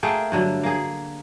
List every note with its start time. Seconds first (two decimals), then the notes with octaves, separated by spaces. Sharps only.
0.03 A3 A#3 G#4 G5
0.32 G2 D3 F#3
0.63 A#3 G#4